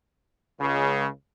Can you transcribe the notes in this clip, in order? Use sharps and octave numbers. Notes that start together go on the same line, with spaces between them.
C#2 C#3